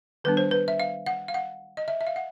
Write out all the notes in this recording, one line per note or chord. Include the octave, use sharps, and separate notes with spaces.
D#3 G3 B3 D4 B4
C5
B4
E5
F5
F#5
F5
F#5
D#5
E5
E5
F5
F#5